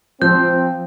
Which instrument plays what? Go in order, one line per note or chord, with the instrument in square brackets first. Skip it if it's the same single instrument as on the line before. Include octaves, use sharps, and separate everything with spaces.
[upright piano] F3 [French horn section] C4 [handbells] G6